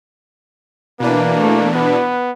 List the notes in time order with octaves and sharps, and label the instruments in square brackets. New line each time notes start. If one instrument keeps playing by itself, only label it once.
[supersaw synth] B2 E3 D4 [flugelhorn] A#3 [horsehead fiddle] B4
[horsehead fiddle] A3
[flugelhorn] B3 [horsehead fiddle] B4